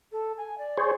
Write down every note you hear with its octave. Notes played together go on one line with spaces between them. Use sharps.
A4
G#5
D5
G#4 C5 C#5